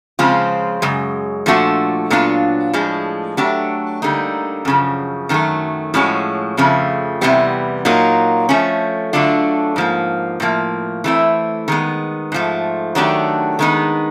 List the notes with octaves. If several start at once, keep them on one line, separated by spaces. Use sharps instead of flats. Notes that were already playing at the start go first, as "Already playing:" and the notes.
C#3 F3 G#3 C4 F4
F#2 C#3 G#3
A#2 F3 A3 D4 F#4
A#2 F#3 B3 D4 F4
A2 F3 G#3
F#3 A3 D4 G4
D3 G3 A#3 D#4
F#2 C#3 F3
F#2 D#3 F#3 A3
A2 F3 G#3 C#4 F#4
F2 C#3 F3 A3
E2 C3 E3 G3 B3
A#2 F#3 A#3 D#4
F3 A3 C#4
D3 F#3 A3 D4 F4
G#2 F3 A#3
A2 F3 A#3
E3 A3 C4 E4
D#3 G#3 B3
G#2 F3 A3
D#3 F#3 A3 D4 G4
D#3 G#3 B3 D#4